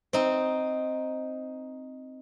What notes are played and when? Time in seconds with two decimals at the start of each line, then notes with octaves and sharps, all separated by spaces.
0.13 C4 D#4